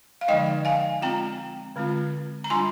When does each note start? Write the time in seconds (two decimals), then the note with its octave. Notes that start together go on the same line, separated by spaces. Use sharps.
0.21 F5
0.28 D3 F3 G#3 D#4 D#5 G5
0.65 F5 G#5
1.02 G#3 C4 F4 G5 A#5
1.76 D3 G#3 C4 F4
2.44 A#5
2.50 G3 D4 F4 G#5 C6